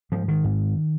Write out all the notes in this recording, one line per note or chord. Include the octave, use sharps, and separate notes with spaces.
G#2 F3
D#3
G#2